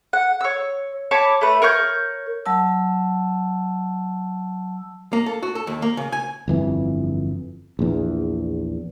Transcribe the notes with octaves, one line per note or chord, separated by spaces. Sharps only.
F#5
C#5 E6
C#5 A5 B5 D6
A3 B4
A#4 C#5 C#6 G6
F#3 A5 E6
A#3
A4
F#4
A4
D#2
A#3
C#3
G#5
G1 F2 E3
A#1 E2